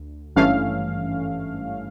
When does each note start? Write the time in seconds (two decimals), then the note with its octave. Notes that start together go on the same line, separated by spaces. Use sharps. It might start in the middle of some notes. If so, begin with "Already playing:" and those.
Already playing: D2
0.36 G#1 G2 E3 A3 C#4 F5